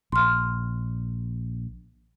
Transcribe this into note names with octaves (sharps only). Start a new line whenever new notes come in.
A#1 C6 F6